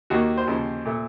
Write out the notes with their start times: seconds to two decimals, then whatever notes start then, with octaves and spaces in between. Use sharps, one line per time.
0.10 D#2 D#3 A#3 F#4
0.37 C5
0.47 D#2 C#3 F3
0.85 A#2 A3